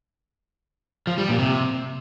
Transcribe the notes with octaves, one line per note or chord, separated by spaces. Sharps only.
F3
G3
A#2
C3